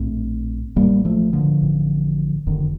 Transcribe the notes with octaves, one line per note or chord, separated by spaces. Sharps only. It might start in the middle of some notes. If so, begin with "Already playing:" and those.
Already playing: A#1 A2 A3 C4
A1 A2 G3 A#3
F3 A3
D3 F3
A1 A2
F1 F2 D3 D#3